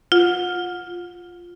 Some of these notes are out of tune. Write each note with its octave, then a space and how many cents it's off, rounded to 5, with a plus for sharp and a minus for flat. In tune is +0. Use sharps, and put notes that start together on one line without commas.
F4 +0 F#5 -25